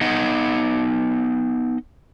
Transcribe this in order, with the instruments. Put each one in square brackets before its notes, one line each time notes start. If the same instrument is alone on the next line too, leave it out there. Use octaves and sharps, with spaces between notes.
[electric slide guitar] B3 D#4 D#5 F#5